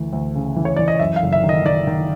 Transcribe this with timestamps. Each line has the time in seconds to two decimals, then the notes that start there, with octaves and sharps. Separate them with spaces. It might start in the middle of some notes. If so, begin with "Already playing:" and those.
Already playing: D2 E3
0.13 D2
0.35 C#3
0.56 E3
0.65 C#5
0.76 E3 D5
0.88 D#5
0.99 F#2 E5
1.16 F5
1.22 F#1
1.33 E5
1.44 D#3
1.49 D#5
1.65 D#3 D5
1.87 D#3